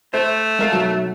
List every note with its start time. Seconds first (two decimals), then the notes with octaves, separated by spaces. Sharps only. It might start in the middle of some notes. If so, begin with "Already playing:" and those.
0.14 A3 C5
0.59 G#3 A#4 F5
0.72 B1 F#3 A5